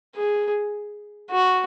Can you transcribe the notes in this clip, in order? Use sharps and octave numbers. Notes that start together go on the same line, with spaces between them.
G#4
F#4